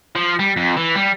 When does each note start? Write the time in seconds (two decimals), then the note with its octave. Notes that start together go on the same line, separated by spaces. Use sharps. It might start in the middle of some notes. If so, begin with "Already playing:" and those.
0.15 F3
0.39 G3
0.56 F2
0.77 E3
0.95 G3